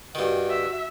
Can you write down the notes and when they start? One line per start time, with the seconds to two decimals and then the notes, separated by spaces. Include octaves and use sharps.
0.15 G2 D#3 F#4
0.49 E5